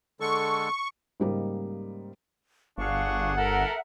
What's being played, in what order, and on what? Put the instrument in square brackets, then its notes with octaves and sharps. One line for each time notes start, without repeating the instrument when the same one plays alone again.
[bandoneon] D3 G#3 A4 [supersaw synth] C#6
[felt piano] G#2 C#3 G3 A#3 D#4
[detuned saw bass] G1 [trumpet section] D4 G#4 F#5 [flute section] F5 C#6
[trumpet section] A4 A#4 [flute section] E5 F#5